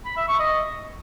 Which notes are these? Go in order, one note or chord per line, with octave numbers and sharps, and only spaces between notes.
B5
E5
C#6
D#5